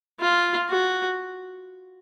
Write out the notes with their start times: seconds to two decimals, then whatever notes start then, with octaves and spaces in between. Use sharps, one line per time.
0.20 F4
0.70 F#4